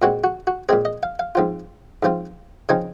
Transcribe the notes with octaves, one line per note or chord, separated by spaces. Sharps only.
A#2 G#3 C4 F#4
F#4
F#4
A#2 G#3 C4 G#4
D#5
F5
F5
G#2 F3 C4 F4
G#2 F3 C4 F4
C#3 F3 C4 D#4 G#5